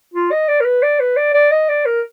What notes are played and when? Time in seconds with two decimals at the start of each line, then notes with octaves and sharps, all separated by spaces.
0.14 F4
0.32 D#5
0.48 D5
0.61 A#4
0.65 B4
0.83 D5
1.00 B4
1.17 D5
1.34 D5
1.51 D#5
1.69 D5
1.86 A#4